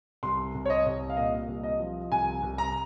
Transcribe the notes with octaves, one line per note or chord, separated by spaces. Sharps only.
C2 C6
C2
C#5
D#5
C2
F5
A#2 D#5
C2
D#5
F3
C2 G#5
C2
A#5